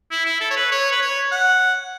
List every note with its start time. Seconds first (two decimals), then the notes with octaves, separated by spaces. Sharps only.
0.11 E4
0.25 E4
0.41 A4
0.50 C#5
0.56 B4
0.72 C#5
0.92 B4
1.02 C#5
1.32 F#5